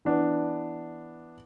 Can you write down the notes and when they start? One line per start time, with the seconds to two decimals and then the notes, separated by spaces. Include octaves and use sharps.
0.05 E3 B3 D4